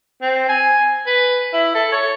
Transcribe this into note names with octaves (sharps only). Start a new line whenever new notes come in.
C4
G#5
B4
E4
A4
C#5